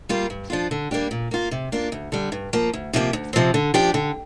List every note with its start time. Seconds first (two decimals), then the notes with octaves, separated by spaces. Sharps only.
0.09 G3 A#3 F4
0.30 G2
0.50 F3 D4 F4
0.71 D3
0.91 G3 A#3 D4 G4
1.11 A#2
1.31 A#3 F4
1.51 C3
1.72 A#3 D4 F4
1.92 D2
2.12 D3 G3
2.32 G2
2.53 F3 A#3
2.73 D2
2.93 C3 F3 A#3 G4
3.13 D2
3.33 C3 F3 C4
3.54 D3
3.74 F3 D4 G4
3.94 D3